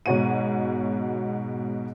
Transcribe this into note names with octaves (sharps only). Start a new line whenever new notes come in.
G#2 B2 F#4 C#5 F#5 D#7